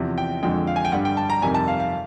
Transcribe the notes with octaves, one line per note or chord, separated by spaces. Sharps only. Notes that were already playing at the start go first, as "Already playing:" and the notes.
Already playing: E2 C3 F3
G5
F2 D3 F3 G#3 G5
F5
G#5
G5
G2 D3 G3 F#5
G5
A5
A#5
F2 C3 D#3 G3 G#5
A5
F5
F5